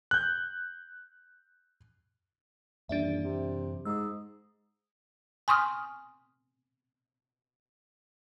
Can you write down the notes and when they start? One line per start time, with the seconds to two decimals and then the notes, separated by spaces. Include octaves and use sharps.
0.11 F#6 G6
2.89 D#1 F#2 E3 D4 D5 E5
3.24 C3
3.85 G#2 D#6 E6
5.48 G#5 C6 C#6 D#6 F6